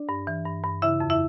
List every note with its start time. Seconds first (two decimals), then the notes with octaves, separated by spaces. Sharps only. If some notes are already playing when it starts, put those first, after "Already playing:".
Already playing: D4 D5
0.09 G2
0.27 E3
0.45 G2
0.64 G2
0.82 C#3 E4 E5
1.00 F2
1.10 E4 E5